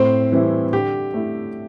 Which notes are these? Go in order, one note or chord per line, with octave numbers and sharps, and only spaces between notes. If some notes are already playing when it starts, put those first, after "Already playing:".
Already playing: A2 C4 C5
E3 G3 C4 E4
D3 G4
A3 E4